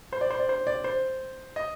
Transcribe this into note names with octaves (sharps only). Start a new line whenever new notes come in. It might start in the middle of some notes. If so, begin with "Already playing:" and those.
C5
D5
C5
D5
C5
D5
C5
D#5